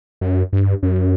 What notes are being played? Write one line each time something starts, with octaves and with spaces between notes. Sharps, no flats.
F#2
G2
F#2